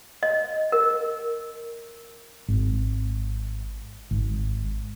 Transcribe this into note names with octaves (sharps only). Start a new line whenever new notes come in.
D#5
A#4
G#1
G#1